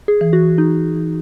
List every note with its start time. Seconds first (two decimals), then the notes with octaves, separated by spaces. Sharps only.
0.08 G#4
0.21 E3
0.33 F#4
0.58 E3 D#4
0.96 E3